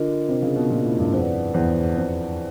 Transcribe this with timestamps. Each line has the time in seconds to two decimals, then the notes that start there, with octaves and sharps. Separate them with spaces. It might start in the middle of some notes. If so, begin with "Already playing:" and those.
Already playing: D3 D4 F4 A#4 D#5
0.28 C3
0.42 C#3
0.56 B2
0.70 A#2
0.85 A2
0.99 G2
1.12 F2 E4 G#4 B4 D5 F#5
1.54 E2
1.96 F2